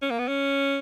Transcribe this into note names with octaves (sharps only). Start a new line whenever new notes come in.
C#4
A#3
B3
C#4